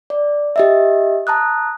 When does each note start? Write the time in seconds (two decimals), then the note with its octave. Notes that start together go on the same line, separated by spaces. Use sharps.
0.10 D5
0.56 G4 D#5 E5
1.27 A5 A#5 D#6 F#6